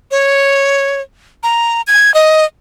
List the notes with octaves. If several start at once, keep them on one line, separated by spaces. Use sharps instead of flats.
C#5
A#5
G#6
D#5